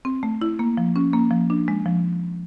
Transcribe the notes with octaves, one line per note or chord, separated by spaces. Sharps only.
C4
A3
E4
A#3
F3
C#4
A#3
F3
D4
G#3
F3